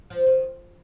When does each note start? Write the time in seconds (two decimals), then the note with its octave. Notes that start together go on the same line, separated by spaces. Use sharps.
0.10 F3
0.26 D#3